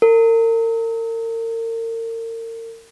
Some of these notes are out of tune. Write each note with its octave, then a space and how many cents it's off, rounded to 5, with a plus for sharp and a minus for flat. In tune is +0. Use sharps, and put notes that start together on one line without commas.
A#4 -35